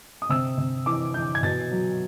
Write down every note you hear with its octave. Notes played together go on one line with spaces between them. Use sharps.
D#6
C3 E6
C3
E3 D6
E3 G6
G#6
B2 A6
F#3